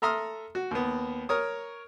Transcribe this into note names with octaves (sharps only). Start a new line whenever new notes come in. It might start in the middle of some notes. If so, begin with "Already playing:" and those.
A4 E5 A#5 C6 D#6 F6
F#4
D#2 B3
A#4 C#5 D#6